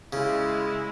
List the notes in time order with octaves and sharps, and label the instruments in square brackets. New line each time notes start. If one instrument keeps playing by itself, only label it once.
[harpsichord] C#3 [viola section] G#3 E4